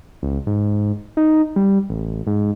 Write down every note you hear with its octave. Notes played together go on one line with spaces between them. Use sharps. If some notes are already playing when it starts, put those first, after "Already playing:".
C#2
G#2
D#4
G3
A1
G#2